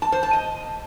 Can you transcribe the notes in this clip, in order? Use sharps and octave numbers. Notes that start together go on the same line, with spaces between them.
A5
C5
A5
D#5